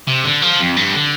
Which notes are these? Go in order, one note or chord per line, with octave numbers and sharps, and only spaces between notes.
C3
D3
F3
F2
G2
D3